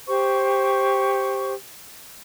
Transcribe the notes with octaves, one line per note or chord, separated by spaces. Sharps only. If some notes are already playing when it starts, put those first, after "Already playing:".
G4 C5 C#6